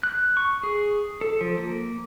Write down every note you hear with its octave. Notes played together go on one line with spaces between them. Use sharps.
F#6
C#6
G#4
A4
F3
A#3